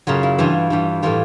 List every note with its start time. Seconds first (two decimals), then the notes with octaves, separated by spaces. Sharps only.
0.07 F#2 C#3 F#3 F4
0.23 E4
0.38 G2 E3 G3 F4
0.70 G2 E3 G3
1.02 A2 E3 G3 F4